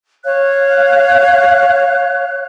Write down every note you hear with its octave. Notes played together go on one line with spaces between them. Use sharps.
C#5 F5 F#6